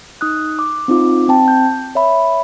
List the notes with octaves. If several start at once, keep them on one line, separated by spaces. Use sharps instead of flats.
D#4 D#6 F#6
D6
C4 D#4 F4 D6
C4 G5 A5
G6
C#5 E5 B5